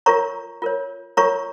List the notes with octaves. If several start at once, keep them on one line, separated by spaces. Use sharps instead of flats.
F4 A#4 C#5 A#5 C#6
F4 A#4 C#5
F4 A#4 C#5 A#5 C#6